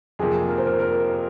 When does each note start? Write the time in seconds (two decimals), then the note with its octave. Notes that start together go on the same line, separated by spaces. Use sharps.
0.19 F2 C3 F3 A#3 G#4
0.49 A#4
0.58 C5
0.66 A#4
0.80 A#4